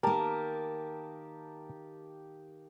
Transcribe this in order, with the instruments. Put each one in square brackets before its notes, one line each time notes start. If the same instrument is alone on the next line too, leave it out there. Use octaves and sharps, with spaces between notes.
[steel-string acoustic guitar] D#3 A#3 [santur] G4 A5 A#5 [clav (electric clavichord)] A#4